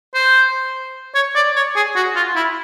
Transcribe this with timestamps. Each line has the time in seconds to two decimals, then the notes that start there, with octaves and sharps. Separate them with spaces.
0.14 C5
1.15 C#5
1.35 D5
1.56 C#5
1.76 G#4
1.96 F#4
2.16 F4
2.36 E4